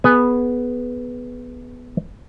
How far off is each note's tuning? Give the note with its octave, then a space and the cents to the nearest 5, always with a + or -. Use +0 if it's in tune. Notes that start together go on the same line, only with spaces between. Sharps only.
B3 +0 G#4 +25 G#5 +0